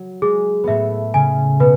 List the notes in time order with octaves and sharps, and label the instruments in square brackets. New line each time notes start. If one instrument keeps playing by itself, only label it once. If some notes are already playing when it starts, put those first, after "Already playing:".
Already playing: [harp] F#3
[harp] G#3 [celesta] G#4
[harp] A2 A3 B3 [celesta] E5
[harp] C#3 C#4 [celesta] G#5
[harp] B2 B3 [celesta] B4